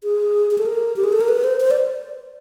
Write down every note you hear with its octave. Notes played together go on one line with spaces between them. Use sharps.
G#4
G#4
A4
A#4
G4
G#4
A4
A#4
B4
C5
C5
D5